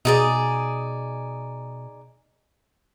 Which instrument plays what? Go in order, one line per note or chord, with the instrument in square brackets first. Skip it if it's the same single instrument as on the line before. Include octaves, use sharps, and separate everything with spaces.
[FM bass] B2 [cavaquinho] D#4 G#4 D5